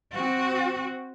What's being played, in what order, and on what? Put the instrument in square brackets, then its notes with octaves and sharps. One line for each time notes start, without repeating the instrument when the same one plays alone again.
[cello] C4 F#4